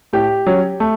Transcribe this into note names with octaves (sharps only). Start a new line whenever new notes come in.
A2 G4
F#3 C#4
A3